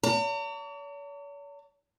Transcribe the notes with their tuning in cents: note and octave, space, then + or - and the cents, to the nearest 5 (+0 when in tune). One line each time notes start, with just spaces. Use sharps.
C#5 +45 A#5 -45